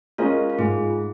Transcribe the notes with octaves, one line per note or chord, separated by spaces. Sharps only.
G#3 C#4 F4 A#4 D#5
F4
G#2 G#4